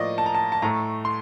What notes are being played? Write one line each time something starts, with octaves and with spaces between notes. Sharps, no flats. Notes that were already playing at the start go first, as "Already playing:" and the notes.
Already playing: A2 F3 A#3 D5 D#5
A5
A#5
A5
A5
A2 A3 A#5
C6